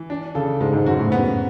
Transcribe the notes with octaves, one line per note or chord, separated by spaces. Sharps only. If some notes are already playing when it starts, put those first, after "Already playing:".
Already playing: E3
D4
C#3 A4
G#2 G#3
G#2
F#2 F#4
A2
G#2 B3
F#2